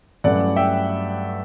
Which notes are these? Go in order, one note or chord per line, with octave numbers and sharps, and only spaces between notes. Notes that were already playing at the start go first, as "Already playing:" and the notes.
G2 F#3 A3 C#4 E4 D5 F#5
E5 G5